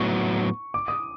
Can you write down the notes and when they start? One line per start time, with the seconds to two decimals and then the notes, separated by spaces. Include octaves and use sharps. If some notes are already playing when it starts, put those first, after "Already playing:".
Already playing: A2 F#3 B3 C#6
0.74 D6
0.88 D#6